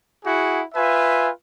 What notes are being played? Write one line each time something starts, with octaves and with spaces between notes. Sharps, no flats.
E4 F#4 G#4 F#5
F4 B4 E5 G#5